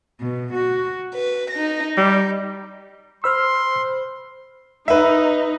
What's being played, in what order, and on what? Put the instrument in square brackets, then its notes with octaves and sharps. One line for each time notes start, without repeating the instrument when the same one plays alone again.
[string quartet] B2
F#4
B4
D#4 A#6
[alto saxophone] G3 [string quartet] D#4
[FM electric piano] C5 B5 [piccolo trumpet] C6 [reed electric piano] E6 F6
[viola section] D#4 [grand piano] B4 E5